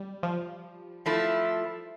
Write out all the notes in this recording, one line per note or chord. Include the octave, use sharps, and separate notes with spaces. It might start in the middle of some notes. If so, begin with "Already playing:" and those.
Already playing: G3
F3
F3 A3 E4